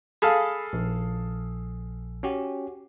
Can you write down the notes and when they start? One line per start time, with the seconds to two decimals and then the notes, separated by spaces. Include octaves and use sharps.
0.22 G#4 A4 F5 B5
0.73 A#1
2.23 C#4 F#4 G4